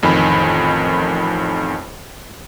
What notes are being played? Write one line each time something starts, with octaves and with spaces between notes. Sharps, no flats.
A1 F2 D#3 G#5 B5